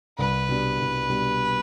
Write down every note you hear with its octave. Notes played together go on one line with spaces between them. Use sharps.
C2 B4
B2 G3 D4
C2
B2 G3 D4